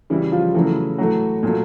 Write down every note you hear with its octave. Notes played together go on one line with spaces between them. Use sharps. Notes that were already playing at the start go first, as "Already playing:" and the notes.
C#3 E3 G3 E4
F3 F4
C#3 E3 F#3 A3 E4
A2 E3 F#3 A3 F#4
A#2 F#3 A3